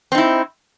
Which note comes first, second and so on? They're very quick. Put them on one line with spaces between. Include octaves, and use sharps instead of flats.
C4 D#4 E4